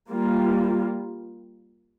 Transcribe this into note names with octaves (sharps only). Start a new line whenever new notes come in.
G3 A#3 F4